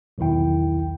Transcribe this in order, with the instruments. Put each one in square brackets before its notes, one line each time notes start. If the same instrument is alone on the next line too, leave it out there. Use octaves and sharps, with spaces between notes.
[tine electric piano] B1 E2 D#3 E4 G5